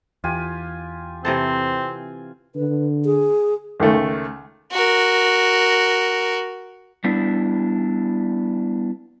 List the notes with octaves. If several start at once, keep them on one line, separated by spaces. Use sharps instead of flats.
E2 F4 G4 G#5
C3 E3 C4 A4 G#5
D3 B4
G#4
C#2 D#3 A3
F#4 A#4
G3 B3 D4 E4